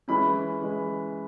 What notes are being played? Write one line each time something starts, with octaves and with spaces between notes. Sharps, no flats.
E3 G#3 C#4 B5
E3 G#3